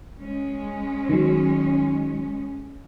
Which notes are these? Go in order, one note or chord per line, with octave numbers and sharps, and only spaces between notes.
G#3 C#4
D#3 F#3